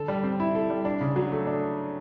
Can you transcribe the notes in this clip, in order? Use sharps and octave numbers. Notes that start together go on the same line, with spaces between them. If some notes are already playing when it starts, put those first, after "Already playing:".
Already playing: D3 A4
G3
C4
E4
A4
G3
D4
C#3
F#3
A3
D4